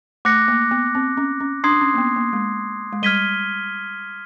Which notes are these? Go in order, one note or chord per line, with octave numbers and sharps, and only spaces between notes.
A3 D6 F#6 A#6 C#7
A#3
B3
C4
C#4
C#4
D4 C6 D#6 G#6 C7
C#4
A#3
B3
A#3
G#3
G#3
G3 F6 G#6 B6 D#7 G7